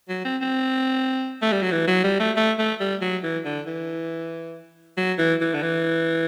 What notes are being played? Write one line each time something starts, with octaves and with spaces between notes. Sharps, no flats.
F#3
C4
C4
A3
G3
F#3
E3
F#3
G3
A3
A3
A3
G3
F#3
E3
D3
E3
F#3
E3
E3
D3
E3